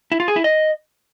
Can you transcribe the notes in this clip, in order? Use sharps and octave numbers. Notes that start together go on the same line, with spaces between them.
E4
F4
G#4
E4
D#5